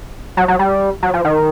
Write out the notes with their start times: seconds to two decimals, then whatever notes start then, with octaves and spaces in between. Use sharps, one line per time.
0.37 F#3
0.48 F#3
0.59 G3
1.03 F#3
1.14 F3
1.25 D#3